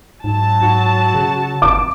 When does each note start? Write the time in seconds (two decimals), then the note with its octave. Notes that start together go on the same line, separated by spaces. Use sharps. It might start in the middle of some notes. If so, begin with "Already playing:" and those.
0.24 G#2 F#3 A5
0.62 G#2 F#4
1.14 C#3
1.62 G1 D6